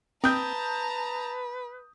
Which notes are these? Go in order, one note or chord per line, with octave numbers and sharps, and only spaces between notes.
C4 B4 A5 A#5 D#6 G6